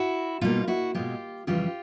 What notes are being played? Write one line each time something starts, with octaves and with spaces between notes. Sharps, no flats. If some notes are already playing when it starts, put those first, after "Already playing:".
Already playing: E4 F#4
B2 G3 A#3 D#4 F4
E4 F#4
B2 G#3 F4 G4
F2 C#3 E3 G3 F4 G4